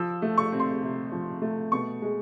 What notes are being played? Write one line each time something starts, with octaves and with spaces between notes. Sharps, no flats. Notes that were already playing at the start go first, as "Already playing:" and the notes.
Already playing: F3 E6
A3
C#6
C4
C6
C3
F3
A3
B2 C#6
G#3